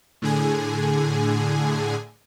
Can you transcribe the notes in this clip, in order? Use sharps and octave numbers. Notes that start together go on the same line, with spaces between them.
A2 D3 G#4 G#5